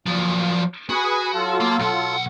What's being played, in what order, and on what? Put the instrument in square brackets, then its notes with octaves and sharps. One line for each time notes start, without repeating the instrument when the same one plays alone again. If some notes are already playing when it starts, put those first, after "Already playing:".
[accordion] A#2 [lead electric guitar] F3 F#3
[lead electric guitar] F#4 [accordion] G#4 B4 D#6
[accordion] F#3 F4 A4
[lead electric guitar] A#3
B1 F#5